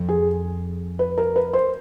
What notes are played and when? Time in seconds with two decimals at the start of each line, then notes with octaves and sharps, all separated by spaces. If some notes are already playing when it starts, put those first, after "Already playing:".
Already playing: F2
0.09 G#4
0.99 B4
1.18 A#4
1.36 B4
1.53 C5